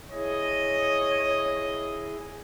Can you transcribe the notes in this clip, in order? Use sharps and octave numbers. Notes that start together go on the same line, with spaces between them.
E4 G#4 C#5 D#5